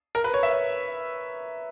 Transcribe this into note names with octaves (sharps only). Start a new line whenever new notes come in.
A#4
B4
C#5
E5